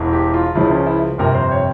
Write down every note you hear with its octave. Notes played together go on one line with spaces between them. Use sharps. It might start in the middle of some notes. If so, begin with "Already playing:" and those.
Already playing: E1 E2 E3
G4
F4
C#2 C#3 F3 E4
C#4
E4
G1 F2 C3 A#4
C5
C#5